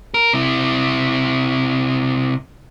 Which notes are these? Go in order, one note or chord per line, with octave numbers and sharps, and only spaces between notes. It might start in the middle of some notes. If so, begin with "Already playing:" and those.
A#4
C3 E4